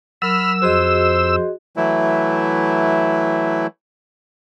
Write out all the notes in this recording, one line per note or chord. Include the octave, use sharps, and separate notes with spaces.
F#3 A#4 B5 E6 F6
F2 F#4 G#4 C5 D#5
E3 F#3 A3 E4